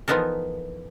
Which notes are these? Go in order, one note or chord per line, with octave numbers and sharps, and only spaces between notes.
E3 F3 B3 D#4 A4 A#4